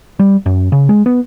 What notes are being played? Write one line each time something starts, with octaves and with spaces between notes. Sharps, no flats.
G3
F#2
C#3
G#3
B3